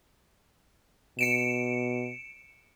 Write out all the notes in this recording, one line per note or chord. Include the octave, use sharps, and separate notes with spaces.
B2 C#7 D7 E7